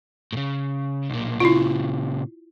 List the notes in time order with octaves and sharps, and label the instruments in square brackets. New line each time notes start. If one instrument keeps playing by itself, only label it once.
[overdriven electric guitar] A2 C#3
B1 A#2
[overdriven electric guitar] A#2 C#3 [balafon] E4 F4